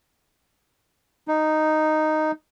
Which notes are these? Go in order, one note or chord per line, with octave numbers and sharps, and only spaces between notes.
D#4